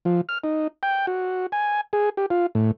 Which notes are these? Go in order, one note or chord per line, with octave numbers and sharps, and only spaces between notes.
F3
F6
D#4
G5
F#4
G#5
G#4
G4
F4
A2